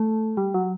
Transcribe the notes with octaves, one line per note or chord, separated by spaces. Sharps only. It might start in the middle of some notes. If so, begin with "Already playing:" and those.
Already playing: A3
G3
F#3